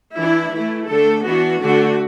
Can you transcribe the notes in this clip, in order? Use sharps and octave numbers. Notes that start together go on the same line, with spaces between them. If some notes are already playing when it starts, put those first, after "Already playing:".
E3 D4 E4
E3 A3 E4
D3 A3 D4 A4
E3 B3 D4 F#4
D3 A3 D4 F#4